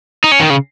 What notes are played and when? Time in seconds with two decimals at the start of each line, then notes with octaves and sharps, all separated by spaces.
0.24 D#4
0.32 C#4
0.40 D#3
0.50 C#3